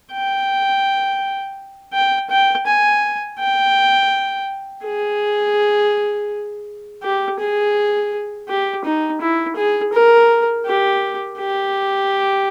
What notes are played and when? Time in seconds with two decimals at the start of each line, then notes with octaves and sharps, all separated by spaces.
0.12 G5
1.93 G5
2.30 G5
2.67 G#5
3.39 G5
4.85 G#4
7.03 G4
7.39 G#4
8.48 G4
8.85 D#4
9.21 E4
9.56 G#4
9.93 A#4
10.66 G4
11.39 G4